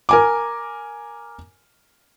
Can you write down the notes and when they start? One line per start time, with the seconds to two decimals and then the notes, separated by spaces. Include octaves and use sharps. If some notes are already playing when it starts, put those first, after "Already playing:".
0.09 A#4 G#5 D6